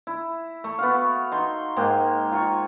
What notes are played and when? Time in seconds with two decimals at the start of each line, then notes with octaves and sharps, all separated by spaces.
0.07 E4
0.64 A3
0.79 B3 F#4 F5
1.32 D#4 C6
1.77 G#2 G#3 A#3 G5
2.32 F4 A#5 C#6